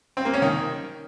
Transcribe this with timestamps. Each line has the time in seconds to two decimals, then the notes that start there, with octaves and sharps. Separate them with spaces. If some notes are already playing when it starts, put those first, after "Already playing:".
0.17 C4
0.25 A#3
0.34 C#4
0.42 D#3